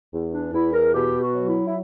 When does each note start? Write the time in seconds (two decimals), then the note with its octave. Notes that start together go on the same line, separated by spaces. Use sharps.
0.13 E2
0.34 D4
0.54 E2 E4
0.73 A#4
0.94 B2 G4
1.21 F#4
1.35 F#3
1.48 E4
1.66 E4